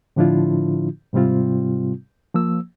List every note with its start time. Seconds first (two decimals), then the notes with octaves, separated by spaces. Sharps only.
0.16 A2 D3 F3 D4 E4 F4
1.13 G#2 C3 G3 C4 F4
2.34 F3 A#3 E6